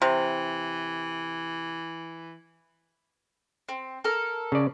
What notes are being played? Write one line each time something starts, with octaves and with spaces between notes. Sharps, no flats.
C3 E3
C4
A4 A#4 F6
C#3 D5